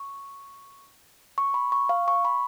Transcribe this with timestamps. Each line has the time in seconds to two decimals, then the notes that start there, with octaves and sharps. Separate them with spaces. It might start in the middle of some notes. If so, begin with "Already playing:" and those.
Already playing: C#6
1.38 C#6
1.54 B5
1.72 C#6
1.89 F5
2.08 C#6
2.25 B5